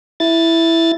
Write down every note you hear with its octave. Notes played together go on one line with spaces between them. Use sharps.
E4 A6